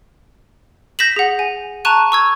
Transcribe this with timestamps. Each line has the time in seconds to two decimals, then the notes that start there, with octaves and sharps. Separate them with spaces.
0.99 G6 A#6 B6 E7 F#7
1.16 G#4 F#5
1.39 G#5
1.85 A5 A#5 C#6 F#6 D#7
2.12 C#6 E6 G#6